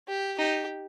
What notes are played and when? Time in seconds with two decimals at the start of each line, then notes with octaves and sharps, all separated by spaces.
0.08 G4
0.38 D#4 G4